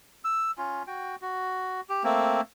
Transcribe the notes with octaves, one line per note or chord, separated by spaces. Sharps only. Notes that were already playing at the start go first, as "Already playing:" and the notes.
E6
C#4 F4
F#4 G5
F#4
G4
A3 A#3 C4